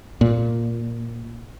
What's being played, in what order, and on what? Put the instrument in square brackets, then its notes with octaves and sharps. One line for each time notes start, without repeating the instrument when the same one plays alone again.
[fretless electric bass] A#2